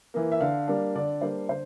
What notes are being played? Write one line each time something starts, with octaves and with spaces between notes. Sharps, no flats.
E3 A#3
E5
D3 F5
G3 A#3 D4
D3 D5
G3 A#3 D4 C5
D3 C5